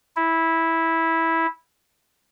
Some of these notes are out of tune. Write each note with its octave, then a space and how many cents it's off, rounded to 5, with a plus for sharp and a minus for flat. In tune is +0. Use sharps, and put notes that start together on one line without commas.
E4 -10